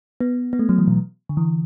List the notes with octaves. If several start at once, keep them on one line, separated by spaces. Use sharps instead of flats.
B3
B3
A3
F#3
E3
B2
D3
E3